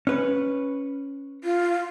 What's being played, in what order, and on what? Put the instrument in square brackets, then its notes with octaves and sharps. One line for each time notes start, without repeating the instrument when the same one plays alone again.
[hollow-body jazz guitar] C#4 B4
[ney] F4